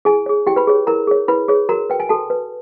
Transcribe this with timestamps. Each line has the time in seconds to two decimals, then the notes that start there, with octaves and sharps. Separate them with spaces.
0.05 E4 G#4 G#5
0.26 G#4 C#5
0.47 E4 G4 G5
0.56 B4 B5
0.67 G#4 C#5
0.87 E4 A#4 A#5
1.07 G#4 C#5
1.28 E4 B4 B5
1.48 G#4 C#5
1.69 F#4 A#4 A#5
1.90 B4 G5
2.00 G#5
2.09 F#4 A4 A5
2.30 B4